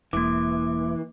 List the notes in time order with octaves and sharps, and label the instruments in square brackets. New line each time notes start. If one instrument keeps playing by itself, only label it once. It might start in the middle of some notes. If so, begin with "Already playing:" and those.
[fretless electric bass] E1 [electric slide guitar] E3 [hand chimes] A#3 D6